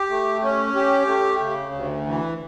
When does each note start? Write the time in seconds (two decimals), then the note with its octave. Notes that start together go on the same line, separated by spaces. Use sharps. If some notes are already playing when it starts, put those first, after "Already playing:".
Already playing: G4
0.09 A3
0.43 C#4
0.75 G4
1.07 A3
1.40 C#3
1.72 D2
2.06 E3